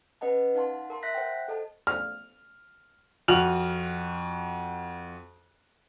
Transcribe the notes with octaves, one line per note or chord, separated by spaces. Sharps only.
C#4 B4 D#5 F#5 A5
D#4 F5 F#5 A5 C6
A#4 A5 C6
E5 F#6 A#6 B6
C5 F#5 G5
A4 D#5 A5
F6
F2 F#4 F6 F7 F#7